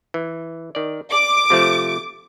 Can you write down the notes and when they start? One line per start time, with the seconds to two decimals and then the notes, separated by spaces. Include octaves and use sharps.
0.14 E3
0.75 D#3 D5
1.12 D5 D6
1.50 C3 F3 A3